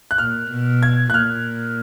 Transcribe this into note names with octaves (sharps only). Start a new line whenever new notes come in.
F#6
A#2 F6
B2
G#6
F#6
A#2 F6